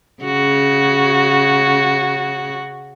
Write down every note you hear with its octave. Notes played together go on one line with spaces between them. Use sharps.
C#3 F#4